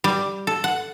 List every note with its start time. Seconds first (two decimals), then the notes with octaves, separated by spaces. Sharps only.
0.04 G3
0.47 A4
0.64 F#5